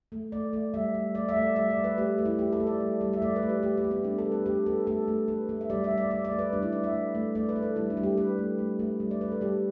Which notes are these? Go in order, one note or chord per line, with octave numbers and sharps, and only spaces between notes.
A3
A3 D5
A3
G3 E5
G3
A3 D5
E5
A3
D5
G3 E5
D5
G3
B4
A3 G4
A3
E4
A3 G4
A4
A3
D5
G3
G3
E5
A3 D5
B4
A3
G4
A3 G4
G4
A3
B3
G3 D4
A4
G3
B4
A3 G4
A3 A4
A3 A4
A3
A3 B4
A3
E5
G3 D5
E5
G3
D5
A3 D5
D5
A3
B4
G3 D4
E4
G3 D5
E5
A3
A3
A3 D5
B4
A3
A4
G3 E4
D4
G3
G4
A3 B4
A3
A3
A3
G3
D5
G3 B4
A4
G3 G4